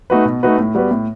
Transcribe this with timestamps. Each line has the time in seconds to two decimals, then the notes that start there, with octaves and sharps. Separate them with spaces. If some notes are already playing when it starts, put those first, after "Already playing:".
0.10 A3 D#4 F#4 B4
0.25 B2
0.43 A3 D#4 F#4 B4
0.58 A2
0.75 G3 B3 F#4 B4
0.91 A2